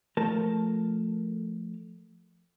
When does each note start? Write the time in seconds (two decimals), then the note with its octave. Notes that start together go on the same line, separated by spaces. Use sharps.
0.17 F3 A3 A#4 A5